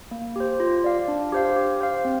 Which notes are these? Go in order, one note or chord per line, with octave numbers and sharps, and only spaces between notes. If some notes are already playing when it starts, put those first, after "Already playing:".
A#3
G4 C5
F4
D5 F5
D4
G4 C5 F5
G4
C5 F5
C4